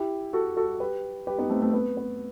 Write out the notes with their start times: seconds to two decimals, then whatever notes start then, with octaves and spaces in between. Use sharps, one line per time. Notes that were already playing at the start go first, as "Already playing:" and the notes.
Already playing: E4 G4
0.33 F#4 A4
0.57 F#4 A4
0.80 G4 B4
1.27 G4 B4
1.38 B3 D#4
1.50 A3 C4
1.61 A3 C4
1.73 B3
1.97 B3